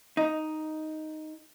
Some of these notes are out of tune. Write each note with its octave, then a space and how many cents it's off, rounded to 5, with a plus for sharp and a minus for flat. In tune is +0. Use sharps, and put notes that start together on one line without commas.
D#4 +0